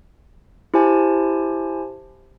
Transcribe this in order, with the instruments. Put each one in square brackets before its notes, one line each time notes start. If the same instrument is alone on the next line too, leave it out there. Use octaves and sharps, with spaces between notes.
[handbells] E4 G4 C5 G#5 A5